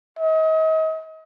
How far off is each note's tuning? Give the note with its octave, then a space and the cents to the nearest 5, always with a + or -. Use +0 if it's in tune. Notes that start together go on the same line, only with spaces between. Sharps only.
D#5 +35